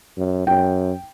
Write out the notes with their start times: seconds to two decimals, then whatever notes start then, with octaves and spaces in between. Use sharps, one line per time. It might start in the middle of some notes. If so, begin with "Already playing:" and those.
0.17 F#2
0.47 F#2 G5